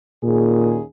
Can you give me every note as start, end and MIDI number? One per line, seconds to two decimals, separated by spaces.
0.23 0.83 39
0.23 0.79 46
0.23 0.83 61
0.23 0.83 68